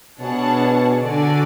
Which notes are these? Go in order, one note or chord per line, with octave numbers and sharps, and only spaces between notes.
B2 D4 G#4 C#5 F#5 A5
D3 D4 F#4 A4 D5 G#5